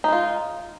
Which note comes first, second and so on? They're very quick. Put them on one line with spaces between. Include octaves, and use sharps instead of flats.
D#4 G#3 F4